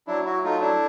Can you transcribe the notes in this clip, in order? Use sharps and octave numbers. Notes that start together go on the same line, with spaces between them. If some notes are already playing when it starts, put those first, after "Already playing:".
F#3 D4 E4
E4 F#4
A3 D#4 F4
D4 E4